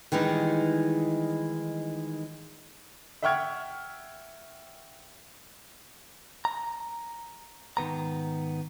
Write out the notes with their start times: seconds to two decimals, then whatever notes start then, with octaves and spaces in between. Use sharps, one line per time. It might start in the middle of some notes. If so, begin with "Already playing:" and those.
0.12 D#3 E3 G3 G#3 D#4
3.22 E5 F#5 G5 C#6 F6 G#6
6.45 A#5
7.77 G#2 D#3 B3 A#5